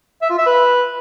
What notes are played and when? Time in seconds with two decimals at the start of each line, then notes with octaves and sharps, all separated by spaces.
0.22 E5
0.30 F4
0.38 E5
0.46 B4